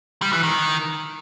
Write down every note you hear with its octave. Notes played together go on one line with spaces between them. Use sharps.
G3
E3
D#3